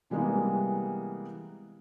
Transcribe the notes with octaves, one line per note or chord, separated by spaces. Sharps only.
C3 E3 G3 G#3 A#3 B3